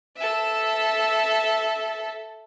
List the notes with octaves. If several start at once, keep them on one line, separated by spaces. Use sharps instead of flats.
A4 E5